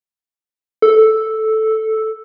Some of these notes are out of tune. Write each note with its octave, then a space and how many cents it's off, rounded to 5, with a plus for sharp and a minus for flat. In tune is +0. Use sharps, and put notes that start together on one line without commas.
A4 -5